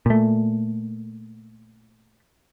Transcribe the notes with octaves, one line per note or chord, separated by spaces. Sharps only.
A#2 A3